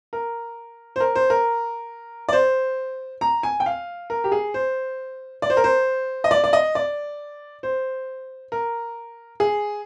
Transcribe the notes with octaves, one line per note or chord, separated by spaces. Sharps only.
A#4
C5
A#4
C5
A#4
D5
C5
A#5
G#5
G5
F5
A#4
G4
G#4
C5
D5
C5
A#4
C5
D#5
D5
D5
D#5
D5
C5
A#4
G#4